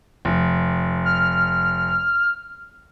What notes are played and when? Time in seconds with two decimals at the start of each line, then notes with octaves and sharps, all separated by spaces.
0.25 F1
1.05 F6